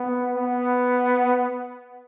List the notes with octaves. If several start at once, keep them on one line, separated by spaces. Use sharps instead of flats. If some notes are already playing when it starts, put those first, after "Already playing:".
Already playing: B3
B3